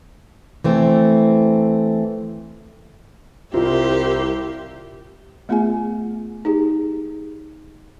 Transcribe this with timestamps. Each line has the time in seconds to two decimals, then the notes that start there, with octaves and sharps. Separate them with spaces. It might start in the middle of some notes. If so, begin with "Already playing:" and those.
0.64 E3 A3 C4
3.54 C2 E4 F4 G4 A#4 C5 E5
5.49 A3 B3 F4 G#4 G#5
6.45 D#4 G4 G#4